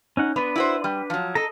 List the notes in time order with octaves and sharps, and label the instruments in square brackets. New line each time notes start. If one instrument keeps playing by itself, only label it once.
[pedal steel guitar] C#4 D#4 F#5
[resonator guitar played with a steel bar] B3 [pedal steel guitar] D4 B4
[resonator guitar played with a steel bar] E4 F#4 C5
G3
F3 F#3
[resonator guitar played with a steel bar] A4 [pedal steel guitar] D#5 A#5